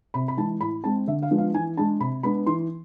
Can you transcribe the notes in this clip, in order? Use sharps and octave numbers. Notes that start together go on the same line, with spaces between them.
C3 B5
B5
E3 G#3 A5
A2 B5
G#3 C4 A5
D3 E5
F5
F3 G#3 B3 D4
F5
E3 G#5
G#3 D4 A5
C3 B5
G#3 B3 D4 B5
E3 C6